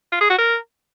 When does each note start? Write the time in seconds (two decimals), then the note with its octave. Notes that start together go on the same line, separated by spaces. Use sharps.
0.12 F4
0.21 G#4
0.30 F#4
0.38 A#4